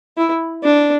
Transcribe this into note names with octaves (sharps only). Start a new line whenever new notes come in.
E4
D4